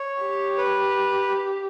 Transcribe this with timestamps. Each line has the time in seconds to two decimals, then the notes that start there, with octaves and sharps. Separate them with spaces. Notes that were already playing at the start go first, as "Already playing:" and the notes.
Already playing: C#5
0.22 G4
0.58 B4